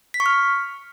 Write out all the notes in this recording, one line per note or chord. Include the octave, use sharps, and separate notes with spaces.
B6
C#6
F6